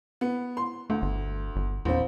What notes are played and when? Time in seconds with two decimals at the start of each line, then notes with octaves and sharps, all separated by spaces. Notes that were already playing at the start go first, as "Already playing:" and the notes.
0.21 B3
0.57 C6
0.90 D2 A3
1.02 G1
1.56 G1
1.85 A#1 E2 C4